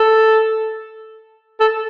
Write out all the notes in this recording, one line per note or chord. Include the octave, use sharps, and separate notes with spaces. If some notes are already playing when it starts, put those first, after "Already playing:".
Already playing: A4
A4